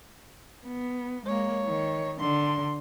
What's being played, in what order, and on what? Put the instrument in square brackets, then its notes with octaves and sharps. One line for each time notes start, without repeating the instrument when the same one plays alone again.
[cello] B3
[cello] G#3 A#3 [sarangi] C#5
[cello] D#3
[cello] D3 [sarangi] C6